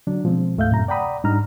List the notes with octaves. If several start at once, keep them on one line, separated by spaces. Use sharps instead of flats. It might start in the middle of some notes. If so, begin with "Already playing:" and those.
D3 F#3 D4
B2 F3 G#3 C4
D2 G#2 A3 E5 F5 G6
F#2 A2 C3 A#5
D5 F#5 G5 A#5 B5 D#6
G#2 G3 D4 D#4 A#5 F6